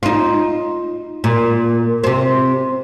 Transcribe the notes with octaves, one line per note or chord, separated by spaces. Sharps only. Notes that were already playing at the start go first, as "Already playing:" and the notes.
D#4 F4
A#2
C3 C4